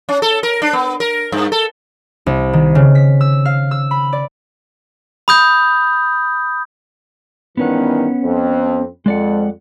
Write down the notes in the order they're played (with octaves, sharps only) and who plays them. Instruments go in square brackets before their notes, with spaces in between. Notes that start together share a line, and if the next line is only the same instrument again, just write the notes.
[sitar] C#4
A4
A#4
D4
B3
A#4
G2
A4
[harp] C2
D#3
C#3
B6
E6
F5
E6
B5
D5
[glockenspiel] B5 D#6 G6
[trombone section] G2 D#3 E3 [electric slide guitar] B3 C#4 F#5
[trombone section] F2 C4
[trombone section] F2 [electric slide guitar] G#3 D5 F#5